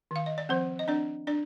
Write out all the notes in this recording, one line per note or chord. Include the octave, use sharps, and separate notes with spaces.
D#3 F5
D#5
D5
F3 C4 C5
D#5
C4 D4 D5
D4 D5